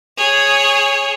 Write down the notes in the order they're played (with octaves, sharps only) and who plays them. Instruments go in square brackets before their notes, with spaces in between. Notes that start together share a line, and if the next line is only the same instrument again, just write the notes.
[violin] G#4 C#5